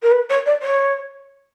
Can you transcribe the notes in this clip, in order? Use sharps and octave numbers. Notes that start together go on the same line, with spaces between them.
A#4
B4
C#5
D5
C#5